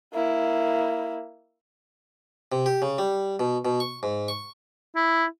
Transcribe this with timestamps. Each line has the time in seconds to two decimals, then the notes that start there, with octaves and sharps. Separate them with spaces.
0.13 A#3 E4
2.52 C3
2.66 G4
2.82 C#3
2.98 G3
3.40 B2
3.65 B2
3.80 C#6
4.03 G#2
4.28 C#6
4.96 E4